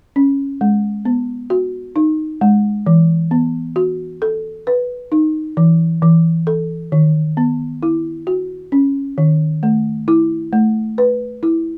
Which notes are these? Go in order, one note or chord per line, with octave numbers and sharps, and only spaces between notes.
C#4
G#3
B3
F#4
D#4
G#3
E3
B3
F#4
A4
B4
D#4
E3
E3
A4
D#3
B3
E4
F#4
C#4
D#3
A3
E4
A3
B4
E4